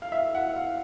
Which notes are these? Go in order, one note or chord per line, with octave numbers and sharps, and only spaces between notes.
F5
E5
F#5
F5